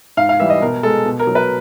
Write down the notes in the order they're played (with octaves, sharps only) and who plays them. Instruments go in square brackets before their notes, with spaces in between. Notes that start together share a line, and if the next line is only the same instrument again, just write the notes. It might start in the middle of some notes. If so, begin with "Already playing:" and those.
[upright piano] G#2 F5
F5
E3 G3 E5
D#5
B2 A#4
G#3 A4
B2
A#4
F#3
B4